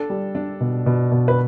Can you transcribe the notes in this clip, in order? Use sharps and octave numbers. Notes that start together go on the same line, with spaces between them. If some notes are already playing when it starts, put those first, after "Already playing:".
Already playing: D4 A4
G3
D4
B2
B2
B2
B4